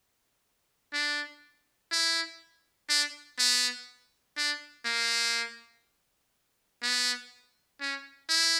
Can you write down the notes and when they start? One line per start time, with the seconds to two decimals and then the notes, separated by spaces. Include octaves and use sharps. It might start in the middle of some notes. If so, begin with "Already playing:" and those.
0.93 D4
1.92 E4
2.89 D4
3.39 B3
4.37 D4
4.85 A#3
6.82 B3
7.80 C#4
8.29 E4